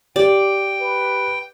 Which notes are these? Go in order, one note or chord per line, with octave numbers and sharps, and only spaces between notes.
G4 D5 G5
B4